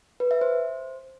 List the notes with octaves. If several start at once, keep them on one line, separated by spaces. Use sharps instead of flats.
B4
E5
C5